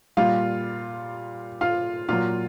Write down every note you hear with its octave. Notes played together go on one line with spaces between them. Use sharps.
A#2 G3 F4 F5
F4 F5
A#2 F#3 F4 F5